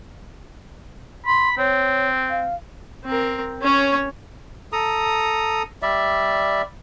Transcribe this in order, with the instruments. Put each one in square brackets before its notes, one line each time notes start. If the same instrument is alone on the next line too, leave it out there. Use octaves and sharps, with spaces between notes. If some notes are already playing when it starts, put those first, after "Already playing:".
[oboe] B5 [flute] C6
[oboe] C4 [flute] C#5
[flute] F5
[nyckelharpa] C4 A#4
C#4 C#5
[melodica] A4 A#5 D#6
G3 D5 E5